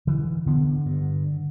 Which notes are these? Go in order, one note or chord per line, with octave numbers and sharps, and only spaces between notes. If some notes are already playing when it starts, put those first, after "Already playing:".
D3 E3
D3 B3
G2